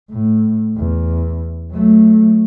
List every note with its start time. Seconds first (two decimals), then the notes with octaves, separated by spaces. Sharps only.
0.11 A2
0.77 E2
1.72 F#3 A3